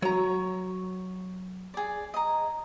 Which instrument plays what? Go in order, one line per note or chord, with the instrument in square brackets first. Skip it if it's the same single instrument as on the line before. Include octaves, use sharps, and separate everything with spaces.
[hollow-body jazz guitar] F#3 A#5 [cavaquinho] C#5
[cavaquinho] G#4 D5
D#5 A#5